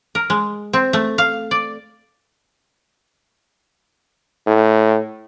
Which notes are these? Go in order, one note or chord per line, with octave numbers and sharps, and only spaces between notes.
A#4
G#3
C4
A3
F5
D5
A2